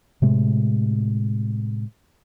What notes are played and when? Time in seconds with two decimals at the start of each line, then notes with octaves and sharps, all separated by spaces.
0.22 A2 C3 G#3